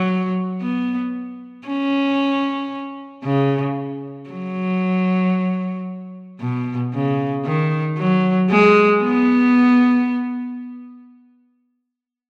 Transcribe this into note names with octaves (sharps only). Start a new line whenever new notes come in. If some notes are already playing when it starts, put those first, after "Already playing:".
Already playing: F#3
B3
C#4
C#3
F#3
B2
C#3
D#3
F#3
G#3
B3